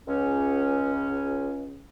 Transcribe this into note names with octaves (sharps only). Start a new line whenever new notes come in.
C#2 C#4